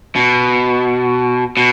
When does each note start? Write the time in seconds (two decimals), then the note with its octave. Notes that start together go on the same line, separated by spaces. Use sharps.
0.15 B2
1.57 B2